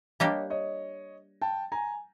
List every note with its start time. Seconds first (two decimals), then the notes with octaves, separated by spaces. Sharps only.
0.20 G3 A#3 D4 G4 C#5 D#5
0.50 C#5 D#5
1.41 G5 A5
1.72 G#5 A#5